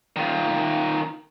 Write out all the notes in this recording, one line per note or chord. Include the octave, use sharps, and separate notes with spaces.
D#3 F4